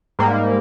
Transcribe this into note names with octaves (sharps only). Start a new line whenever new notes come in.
G#2 G3 A#3